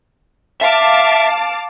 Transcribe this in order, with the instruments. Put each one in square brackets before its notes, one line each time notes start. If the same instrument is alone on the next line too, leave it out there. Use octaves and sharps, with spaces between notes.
[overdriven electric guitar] E5 [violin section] F5 A5 D6